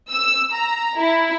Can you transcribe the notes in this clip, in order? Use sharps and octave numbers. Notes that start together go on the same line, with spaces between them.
E6
A#5
E4